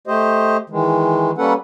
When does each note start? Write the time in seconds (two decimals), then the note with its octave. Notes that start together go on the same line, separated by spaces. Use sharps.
0.07 A3 G4 C5 D#5
0.70 D#3 E3 G#3
1.38 G3 A#3 C#4 A4 B4 F#5